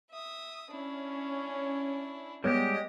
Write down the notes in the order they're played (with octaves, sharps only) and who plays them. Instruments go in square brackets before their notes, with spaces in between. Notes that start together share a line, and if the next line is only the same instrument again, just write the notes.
[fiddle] E5 D#6
[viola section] C#4 [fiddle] D4 E4
[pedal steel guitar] G3 G#3 G4 [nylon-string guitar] B3 C#5 [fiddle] D#5